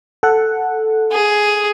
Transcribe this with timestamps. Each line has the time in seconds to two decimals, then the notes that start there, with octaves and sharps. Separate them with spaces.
0.23 A4 F#5
1.12 G#4